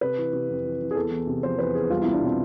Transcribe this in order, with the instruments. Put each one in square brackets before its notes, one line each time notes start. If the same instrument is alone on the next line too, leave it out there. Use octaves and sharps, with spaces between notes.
[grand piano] C3 B4
E3
C3
F2
E3
E3
G#4
E2 A4
E2
C3
F3 C5
E2 B4
E2 G#4
C2 F4
C2 E4
D4
B2 C4